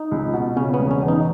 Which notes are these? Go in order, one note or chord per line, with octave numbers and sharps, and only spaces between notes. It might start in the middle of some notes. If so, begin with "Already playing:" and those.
Already playing: D#4
C#2
B2
C#3 C#4
B3
E1
C#4
E2
D#4